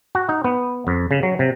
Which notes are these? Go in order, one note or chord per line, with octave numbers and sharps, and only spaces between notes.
F#4
D#4
B3
F2
C#3
F#3
C3